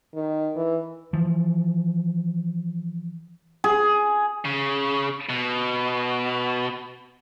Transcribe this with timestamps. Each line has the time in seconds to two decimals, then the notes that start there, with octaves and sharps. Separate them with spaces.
0.14 D#3
0.56 E3
1.13 E3 F3
3.64 G#4
4.45 C#3
5.29 B2